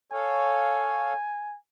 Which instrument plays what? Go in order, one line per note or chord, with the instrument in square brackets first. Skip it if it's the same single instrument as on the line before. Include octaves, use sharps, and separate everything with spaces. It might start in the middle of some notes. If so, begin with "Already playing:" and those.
[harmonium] A4 C#5 F5 [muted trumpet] G#5